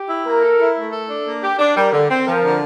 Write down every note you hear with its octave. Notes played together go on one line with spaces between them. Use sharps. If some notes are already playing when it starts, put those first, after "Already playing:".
Already playing: G4
E4
A#3 A#4
A4
E4
A3
A4
D4
A#3
G4
D4
G3 A#4
D3
C4
F3 A#4
D3